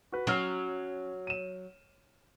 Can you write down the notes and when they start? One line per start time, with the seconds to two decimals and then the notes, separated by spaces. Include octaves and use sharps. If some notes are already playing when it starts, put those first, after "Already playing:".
0.12 F#4 B4
0.27 F#3 C#4 F6 C7
1.27 D#7 E7